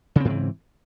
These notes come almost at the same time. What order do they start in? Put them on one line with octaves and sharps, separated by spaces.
C#3 C4 G#2 E3